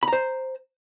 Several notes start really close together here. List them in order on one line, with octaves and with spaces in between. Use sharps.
B5 A#5 C5